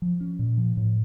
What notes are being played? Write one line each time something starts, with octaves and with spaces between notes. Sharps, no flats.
F3
C#4
A#2
F3
A2